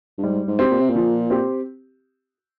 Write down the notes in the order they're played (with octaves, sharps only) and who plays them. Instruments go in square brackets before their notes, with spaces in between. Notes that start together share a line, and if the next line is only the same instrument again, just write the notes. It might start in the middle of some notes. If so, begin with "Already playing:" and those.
[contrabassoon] G2
[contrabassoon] G#2 [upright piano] G3
[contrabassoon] G#2
[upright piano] C4 G4
[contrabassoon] A#2
C3
A#2
[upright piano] F3
C4 G4